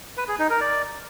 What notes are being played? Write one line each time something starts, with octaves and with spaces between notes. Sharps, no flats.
B4
G#4
D#4
A#4
D5